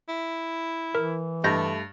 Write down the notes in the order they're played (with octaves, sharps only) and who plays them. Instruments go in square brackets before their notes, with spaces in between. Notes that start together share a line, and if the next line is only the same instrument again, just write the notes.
[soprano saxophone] E4
[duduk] E3 [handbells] A#4
[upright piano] G2 [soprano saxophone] A3 [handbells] D#5 G6 A#6